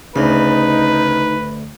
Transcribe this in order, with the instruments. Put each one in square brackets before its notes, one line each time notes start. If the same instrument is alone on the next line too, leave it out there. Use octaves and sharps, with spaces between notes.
[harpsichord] D2 [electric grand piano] C#3 [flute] D#4 [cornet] B4